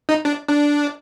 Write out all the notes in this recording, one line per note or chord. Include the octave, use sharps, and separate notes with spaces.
D#4
D4
D4